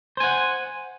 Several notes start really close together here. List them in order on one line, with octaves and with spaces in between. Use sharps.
C5 G#5 F#5